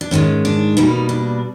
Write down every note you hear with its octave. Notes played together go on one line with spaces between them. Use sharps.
D4
G#2 D#3 G#3 C#4
D4
B2 G3 A#3 D#4
D4